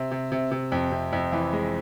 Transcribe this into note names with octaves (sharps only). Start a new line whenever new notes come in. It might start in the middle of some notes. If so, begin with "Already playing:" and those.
Already playing: C3
C3
C3
C3
F2
C3
F2
E3
G#3